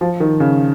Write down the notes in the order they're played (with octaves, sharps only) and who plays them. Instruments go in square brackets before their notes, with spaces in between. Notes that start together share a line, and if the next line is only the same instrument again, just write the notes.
[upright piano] F3
D#3
C#3